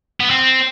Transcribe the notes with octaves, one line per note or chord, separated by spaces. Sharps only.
B3
C4